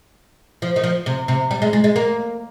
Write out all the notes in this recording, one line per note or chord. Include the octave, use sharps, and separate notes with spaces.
F3
D#3
F3
C3
C3
G3
G#3
G#3
G#3
A#3